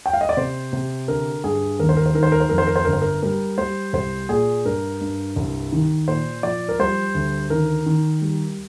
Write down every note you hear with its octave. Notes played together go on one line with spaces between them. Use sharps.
G5
F5
D#5
D5
C3 C5
C3
D3 A#4
G2 G#4
D#2 A#4
C5
A#4
C5
D#3 A#4
C5
A#4
C5
F2 A#4
C5
A#4
C5
G1 A#4
C5
A#4
G3 A#4
G3 C5
C2 C5
A#2 G#4
G2 A#4
G2
C2
D#3
A#2 C5
F3 D5
A#4
G3 C5
D2
D#3 A#4
D#3
G3